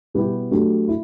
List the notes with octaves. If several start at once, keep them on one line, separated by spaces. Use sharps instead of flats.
B2 G3 B3 E4 G4
F#3 A3 D4 G4
E4